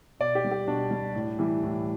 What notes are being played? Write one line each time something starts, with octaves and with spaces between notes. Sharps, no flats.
B2 D5
G4
G3
G4
B2 D4
G3
A2
E3 G3
A2